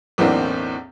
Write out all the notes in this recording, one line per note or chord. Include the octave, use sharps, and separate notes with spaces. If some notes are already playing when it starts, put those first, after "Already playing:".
B1 E2 A2 A#3 C4 D4